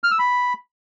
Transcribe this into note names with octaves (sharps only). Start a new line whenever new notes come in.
F6
E6
B5